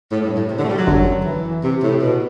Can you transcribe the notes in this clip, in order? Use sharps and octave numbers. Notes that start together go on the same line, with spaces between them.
A2
G2
A2
C3
D3
A3
G3
F#3
G1 F#2 D3
E3
C3
A2
B2